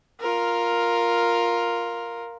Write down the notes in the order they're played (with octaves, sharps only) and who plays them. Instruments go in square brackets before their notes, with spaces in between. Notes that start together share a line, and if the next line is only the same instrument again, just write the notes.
[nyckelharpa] F4 A#4